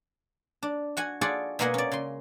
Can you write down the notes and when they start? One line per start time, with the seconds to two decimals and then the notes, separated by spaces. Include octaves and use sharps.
0.63 D4
0.97 F#4 F#5 G#5
1.21 F4 F#4 G#4 A4 D5 F#5
1.59 B2 G#3 A#3 D#5 F#5 G#5
1.74 C#4 D5
1.92 C#3 C6